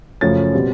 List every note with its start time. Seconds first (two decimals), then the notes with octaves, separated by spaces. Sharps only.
0.21 F#2 C#3 F3 A3 C#4 A6
0.54 B2 G3 C4